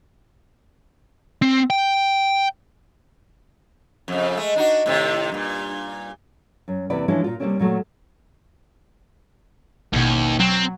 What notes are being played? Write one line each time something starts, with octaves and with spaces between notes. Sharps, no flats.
C4
G5
F2 C#3
G#3 A3
D4 D#4 F#4
A2 C3 D#3
G2 A#2
F#2
E2 C3 A#3 E4 B4 D5
E3 F3 G#3 C#4 D4 E4
A#2 F4
C3 F#3 G3 A#3 C4 C#4
A#2 F#3 A3
A1 D#2 B2
F#3 C4